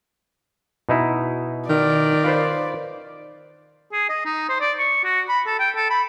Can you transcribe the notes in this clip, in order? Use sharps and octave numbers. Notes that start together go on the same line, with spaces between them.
B2 D#4 E4
D#3 D5
F4 B4 C5
G#4
D#5
D#4
C5
D5
C#6
F#4
B5
A4
G5
A4
B5